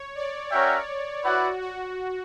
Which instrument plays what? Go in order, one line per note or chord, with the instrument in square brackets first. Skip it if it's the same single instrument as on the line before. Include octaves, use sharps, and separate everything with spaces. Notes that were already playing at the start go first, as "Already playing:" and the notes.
Already playing: [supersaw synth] C#5
D5
[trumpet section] C#4 F#4 A#4 E5 G5 [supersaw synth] C#5
[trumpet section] E4 B4 D5 F#5 [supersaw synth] F#4
[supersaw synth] F#4